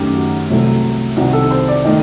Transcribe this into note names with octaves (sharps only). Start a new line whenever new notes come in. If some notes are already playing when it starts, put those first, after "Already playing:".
Already playing: F#2 D#3 A3 G4
F#4
C2 C3 F#3 A3
C2 C3 D#3 F#4
A4
C5
D5
D#3 A3 D#5